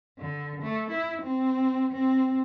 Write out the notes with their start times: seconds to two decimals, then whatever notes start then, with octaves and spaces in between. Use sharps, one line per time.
0.18 D3
0.62 A3
0.90 E4
1.21 C4
1.93 C4